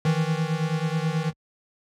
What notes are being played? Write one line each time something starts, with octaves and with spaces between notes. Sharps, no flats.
D#3 E3